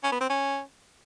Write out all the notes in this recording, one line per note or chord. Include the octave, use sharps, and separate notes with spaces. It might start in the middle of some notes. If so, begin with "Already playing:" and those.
C#4
B3
C4
C#4